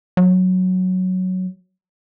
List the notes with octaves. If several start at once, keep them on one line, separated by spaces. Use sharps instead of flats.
F#3